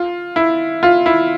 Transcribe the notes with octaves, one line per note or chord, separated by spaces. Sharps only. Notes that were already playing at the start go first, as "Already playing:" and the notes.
Already playing: F4
E4
F4
E4